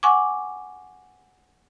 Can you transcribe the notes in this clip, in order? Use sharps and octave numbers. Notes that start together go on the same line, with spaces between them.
F#5 G#5 C#6 D6